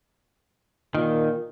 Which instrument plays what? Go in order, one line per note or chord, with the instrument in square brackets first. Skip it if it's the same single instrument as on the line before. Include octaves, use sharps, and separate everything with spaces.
[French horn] A#2 [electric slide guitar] D#3